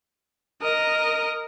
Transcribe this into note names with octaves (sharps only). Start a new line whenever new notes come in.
A#4 D#5